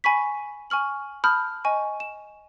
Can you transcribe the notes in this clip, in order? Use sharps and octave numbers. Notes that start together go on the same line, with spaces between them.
G#5 B5 C#6 B6
G#5 C#6 F6 F#7
A5 B5 D#6 F6 G6
D#5 G#5 C#6
E7